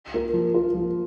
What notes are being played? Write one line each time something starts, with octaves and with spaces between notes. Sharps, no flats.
A#3 F4 A#4
F3
A#3 F4 A#4
F3